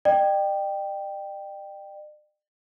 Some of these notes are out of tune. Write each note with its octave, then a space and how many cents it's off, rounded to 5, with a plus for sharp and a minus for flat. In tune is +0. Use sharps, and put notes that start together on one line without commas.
D5 +45 G5 +0